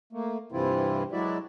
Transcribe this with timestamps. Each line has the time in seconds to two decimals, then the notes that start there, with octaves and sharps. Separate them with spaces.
0.13 A3 A#3
0.52 G2 C3 E3 C4 E4 F4
1.12 F#3 G#3 E4 F#4 D5 E5